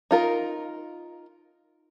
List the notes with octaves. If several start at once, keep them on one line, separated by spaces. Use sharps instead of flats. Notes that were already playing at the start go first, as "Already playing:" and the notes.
D#4 F4 A#4